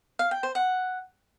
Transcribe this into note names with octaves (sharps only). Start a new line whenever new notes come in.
F5
G5
C5
F#5